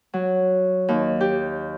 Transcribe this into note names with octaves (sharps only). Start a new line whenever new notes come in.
F#3
D#2
G4